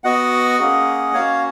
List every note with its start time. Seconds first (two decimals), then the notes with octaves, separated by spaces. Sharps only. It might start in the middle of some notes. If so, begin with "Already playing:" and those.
0.04 B3 F#4 D#5 F#5
0.60 A#3 C#4 G#4
1.14 A#3 C#4 F#4 C#5 F5